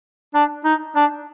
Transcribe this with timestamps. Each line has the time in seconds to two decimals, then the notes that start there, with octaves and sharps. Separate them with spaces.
0.34 D4
0.65 D#4
0.96 D4